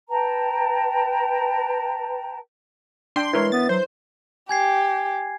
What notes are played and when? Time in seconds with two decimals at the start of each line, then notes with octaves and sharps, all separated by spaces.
0.10 B4 G5 A5 A#5
3.16 D4 G5 C6
3.33 E3 G#3 E4 A#4 C#5
3.52 B3 A6
3.69 F#3 C5
4.49 G4 G#5 G#6 C7